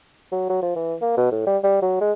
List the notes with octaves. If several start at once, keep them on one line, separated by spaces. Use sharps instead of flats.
F#3
F#3
F3
E3
A#3
B2
A2
G3
G3
F#3
G#3